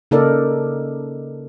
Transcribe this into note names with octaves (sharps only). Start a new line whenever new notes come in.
C#3 A#3 D#4 A4 A#4 D5